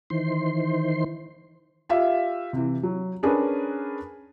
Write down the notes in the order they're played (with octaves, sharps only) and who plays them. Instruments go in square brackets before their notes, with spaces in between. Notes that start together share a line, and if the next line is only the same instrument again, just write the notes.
[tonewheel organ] D#3 E3 C5 C6
[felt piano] F4 G4 E5 F5
C3 E3
F#3
C#4 D4 G#4 A#4 B4